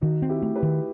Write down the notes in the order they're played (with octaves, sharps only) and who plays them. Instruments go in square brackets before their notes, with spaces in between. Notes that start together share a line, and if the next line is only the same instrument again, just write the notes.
[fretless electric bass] D#3 [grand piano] D#4 F#4
[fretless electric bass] C4
[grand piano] E4 G4
[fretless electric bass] A3
[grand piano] G4 B4
[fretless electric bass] D#3